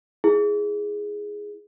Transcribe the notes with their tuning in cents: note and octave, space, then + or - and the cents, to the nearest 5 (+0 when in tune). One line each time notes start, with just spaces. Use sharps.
E4 +0 G#4 +0